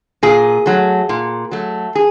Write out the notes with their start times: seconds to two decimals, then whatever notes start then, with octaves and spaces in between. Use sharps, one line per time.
0.23 A#2 G#4
0.66 F#3 A3
1.09 A#2
1.51 F#3 A3
1.95 G#4